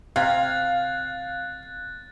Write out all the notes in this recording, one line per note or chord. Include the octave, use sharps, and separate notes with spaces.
C3 F5 F#6 G#6 A6